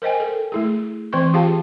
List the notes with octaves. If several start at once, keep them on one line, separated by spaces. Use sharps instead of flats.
A#4 C5 D#5 G5 G#5
A4 A#4
A3 E4 G#4
E3 C4 C5 C6 C#6
F4 G4 G#4 F5 G5 A5